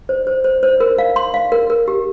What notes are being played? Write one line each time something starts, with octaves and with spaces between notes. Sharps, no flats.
C5
C5
C5
C5
A#4
F5
C6
F5
A#4
A#4
G4